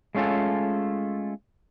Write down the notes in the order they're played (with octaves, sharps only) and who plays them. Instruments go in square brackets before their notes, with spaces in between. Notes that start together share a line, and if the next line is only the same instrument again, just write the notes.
[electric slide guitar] G#3 A3 C#4 F4 A4